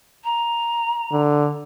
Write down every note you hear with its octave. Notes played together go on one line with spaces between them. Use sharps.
A#5
D3